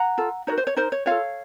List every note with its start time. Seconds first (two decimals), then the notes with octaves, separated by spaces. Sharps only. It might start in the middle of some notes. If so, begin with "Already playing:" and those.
Already playing: F#5 A#5
0.18 F4 A4
0.47 D#4 F#4 A#4 C#5
0.58 C5
0.67 C#5
0.76 D#4 A#4 C5
0.92 C#5
1.06 F4 A4 C#5 F5